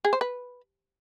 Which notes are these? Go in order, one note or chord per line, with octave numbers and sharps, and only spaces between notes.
G#4
C5
B4